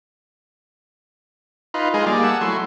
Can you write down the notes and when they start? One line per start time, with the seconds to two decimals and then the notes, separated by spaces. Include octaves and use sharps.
1.74 D#4 F4 B4
1.94 G#3 D#4 F4 G#4 A#4
2.06 G3 A#3 G#4 D5
2.24 F#5 G#5 A5 E6
2.41 F#3 A3 E4 C6